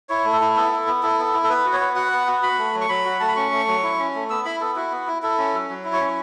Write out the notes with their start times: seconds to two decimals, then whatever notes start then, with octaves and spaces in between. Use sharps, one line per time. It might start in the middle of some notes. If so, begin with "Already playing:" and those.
0.09 E4 C#5
0.25 A3
0.33 A4
0.41 E4
0.56 B3 A4
0.72 E4
0.87 B3
1.03 E4 A4
1.19 B3
1.34 E4
1.44 A4
1.49 B3 B4
1.65 F#4
1.73 C#5
1.80 B3
1.96 F#4 F#5
2.12 B3
2.27 F#4
2.43 F#4 B5
2.59 A3
2.75 F#3
2.81 C#6
2.89 F#3 B5
3.05 F#4
3.20 A3 A5
3.28 B5
3.36 C#4 C#6
3.52 A3
3.68 F#3
3.83 E4
3.99 C#4
4.15 A3
4.30 B3 E6
4.45 E4 B5
4.60 B3 A4
4.76 E4 F#4
4.91 B3
5.08 E4
5.22 E4 A4
5.38 C#4
5.54 F#3
5.70 F#3
5.85 E4
5.93 C#5
6.01 C#4